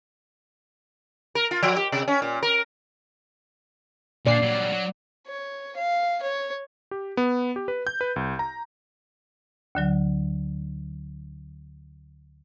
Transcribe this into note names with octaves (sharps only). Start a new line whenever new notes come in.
A#4
F4
F3
G4
C3
C#4
A#2
A#4
A#2 D3 D5 C7
F#3 G3
F#3
C#5
F5
C#5
G4
B3
G4
B4
G6
B4
C2
A#5
D2 D3 F#3